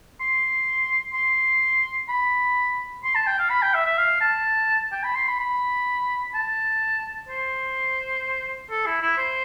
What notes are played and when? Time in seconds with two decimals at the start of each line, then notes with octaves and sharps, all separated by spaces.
0.20 C6
1.14 C6
2.09 B5
3.04 C6
3.15 A5
3.27 G5
3.39 F5
3.50 B5
3.62 G5
3.74 E5
3.86 E5
3.98 F5
4.21 A5
4.92 G5
5.04 B5
5.16 C6
5.28 B5
5.40 B5
6.35 A5
7.29 C5
8.71 A4
8.86 E4
9.02 E4
9.18 C5